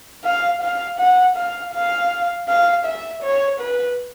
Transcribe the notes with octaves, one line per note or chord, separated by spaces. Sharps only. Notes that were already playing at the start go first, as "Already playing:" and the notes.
F5
F5
F#5
F5
F5
F5
E5
C#5
B4